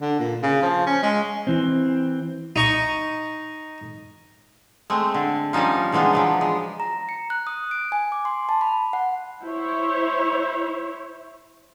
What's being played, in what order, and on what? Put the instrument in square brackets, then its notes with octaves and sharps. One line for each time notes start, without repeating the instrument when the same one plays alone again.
[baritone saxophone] D3
A#2
C#3
F3
C#4
G#3
[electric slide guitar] E3 C4
[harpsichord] D#4 C#6
[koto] G#3 A3 C4
D3
F3 G3 C#4 D#4 F4
C#3 E3 G#3 B3 D4
F3 F#3 B3
G#3
[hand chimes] A#5
C#7
F#6
D#6
D7
G#5
D6
C6
A5
B5
F#5
[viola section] E4 C5 C#5